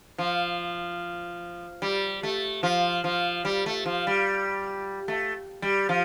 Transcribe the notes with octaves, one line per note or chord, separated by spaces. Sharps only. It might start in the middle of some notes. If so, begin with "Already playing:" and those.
F3
G3
A3
F3
F3
G3
A3
F3
G3
A3
G3
F3